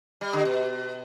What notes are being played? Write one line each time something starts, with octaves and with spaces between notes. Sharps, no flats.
G3
D3
B2